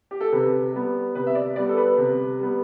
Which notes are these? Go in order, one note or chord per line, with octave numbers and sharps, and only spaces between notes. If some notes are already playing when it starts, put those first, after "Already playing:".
G4
A4
C3 B4
G3 B3
C3 B4
E5
D5
G3 B3 D5
A4
B4
C3
G3 B3